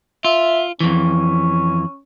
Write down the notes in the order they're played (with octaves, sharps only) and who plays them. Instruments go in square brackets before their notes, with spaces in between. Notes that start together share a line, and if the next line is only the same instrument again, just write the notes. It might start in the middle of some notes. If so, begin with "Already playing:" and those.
[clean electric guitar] F4 [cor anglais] E5
[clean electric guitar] F2 E3 [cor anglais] C#4